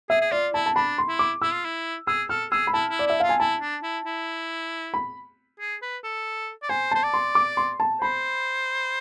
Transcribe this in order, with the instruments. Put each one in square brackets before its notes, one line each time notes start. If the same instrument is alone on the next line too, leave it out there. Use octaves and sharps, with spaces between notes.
[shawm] G#4 [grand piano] E5
[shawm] G#4
[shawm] F4 [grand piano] D5
[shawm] E4 [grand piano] A5
[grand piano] A5
[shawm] D4 [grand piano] B5
[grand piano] C6
[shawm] E4
[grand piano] D6
[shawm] E4 [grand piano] E6
[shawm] F4
E4
[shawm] G#4 [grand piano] E6
[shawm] A4 [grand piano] F6
[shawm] G#4 [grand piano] E6
[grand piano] B5
[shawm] E4 [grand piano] A5
[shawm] E4
[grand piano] D5
[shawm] E4 [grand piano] E5
[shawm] F4 [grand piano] F5
[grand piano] G#5
[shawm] E4 [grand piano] A5
[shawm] D4
E4
E4
[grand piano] B5
[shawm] G#4
B4
A4
D5
[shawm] C5 [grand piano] G#5
[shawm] C5 [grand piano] A5
[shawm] D5
[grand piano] C6
D6
C6
A5
[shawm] C5 [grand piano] B5